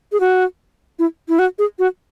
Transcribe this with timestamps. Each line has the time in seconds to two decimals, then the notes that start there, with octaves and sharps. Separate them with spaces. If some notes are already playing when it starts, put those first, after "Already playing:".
0.12 G#4
0.20 F#4
0.99 E4
1.29 E4
1.39 F#4
1.59 G#4
1.79 F#4